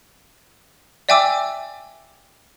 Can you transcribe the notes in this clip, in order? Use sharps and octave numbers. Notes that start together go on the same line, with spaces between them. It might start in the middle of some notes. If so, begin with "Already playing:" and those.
D5 E5 G5 G#5 D6 E6